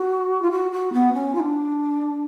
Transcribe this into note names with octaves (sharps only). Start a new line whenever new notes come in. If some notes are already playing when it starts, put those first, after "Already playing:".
Already playing: F#4
F4
F#4
F#4
B3
C#4
F4
D4